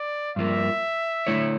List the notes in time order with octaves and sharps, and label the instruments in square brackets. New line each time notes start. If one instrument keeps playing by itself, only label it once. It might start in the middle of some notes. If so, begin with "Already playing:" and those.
Already playing: [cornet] D5
[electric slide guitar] G2 F3 A#3 [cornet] E5
[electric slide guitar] D3 A3 E4 A4 C#5